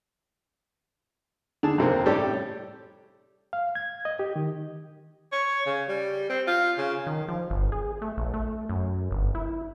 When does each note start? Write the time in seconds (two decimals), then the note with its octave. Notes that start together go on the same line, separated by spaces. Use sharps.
1.63 D3 G#4 A5
1.78 F2 C3 A#3 C4
2.06 A2 G3 C#4 G4 A4
3.53 F5
3.75 G#6
4.05 D#5
4.19 G4
4.36 D#3
5.32 C#5
5.66 C#3
5.88 G3
6.29 C4
6.47 F4
6.78 C#3
7.07 D#3
7.28 F3
7.50 G1
7.72 G#4
8.02 A3
8.17 A#1
8.34 A3
8.69 F#2
9.11 G1
9.35 E4